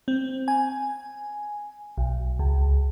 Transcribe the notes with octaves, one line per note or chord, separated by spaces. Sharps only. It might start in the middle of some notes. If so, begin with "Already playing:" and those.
C4
G#5
B1
C#2